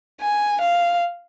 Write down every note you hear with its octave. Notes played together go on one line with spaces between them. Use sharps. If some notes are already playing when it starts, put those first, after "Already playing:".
G#5
F5